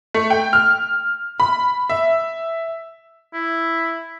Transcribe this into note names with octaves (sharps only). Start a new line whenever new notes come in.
A3
G5
F6
B5
E5
E4